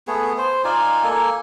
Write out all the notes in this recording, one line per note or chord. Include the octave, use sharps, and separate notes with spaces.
A3 B3 G#4
C5
D#4 F4 D5 G#5
A#3 A4 G#5